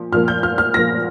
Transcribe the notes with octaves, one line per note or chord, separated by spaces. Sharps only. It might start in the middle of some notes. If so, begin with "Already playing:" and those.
Already playing: A#2 F3
A#2 F3 A#3 F6
G6
F6
F6
A#2 F3 A#3 A#6